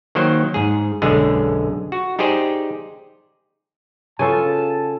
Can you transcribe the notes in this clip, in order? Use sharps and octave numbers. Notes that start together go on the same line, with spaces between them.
D#3 F#3 A#3 C5 G5
G#2 G#4
B1 F#2 D3 G#3 G#4
F#4
D#4 G4 G#4 C5 D5
C#3 B3 F4 A4 G#5 A5